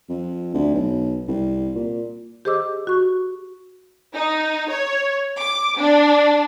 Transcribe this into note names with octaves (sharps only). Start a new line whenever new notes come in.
F2
D2
B1
C2
A#2
G4 G#4 C5 D#5 D6 E6
F#4 C#6
D#4
C#5
D6
D4